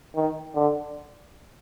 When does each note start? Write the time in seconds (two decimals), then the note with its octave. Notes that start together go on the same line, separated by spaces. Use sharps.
0.15 D#3
0.55 D3